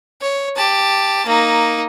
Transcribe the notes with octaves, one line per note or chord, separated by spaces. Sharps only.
C#5
G4 A5
A#3 D#4